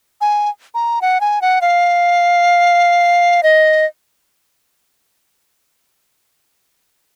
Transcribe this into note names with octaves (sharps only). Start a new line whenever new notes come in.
G#5
A#5
F#5
G#5
F#5
F5
D#5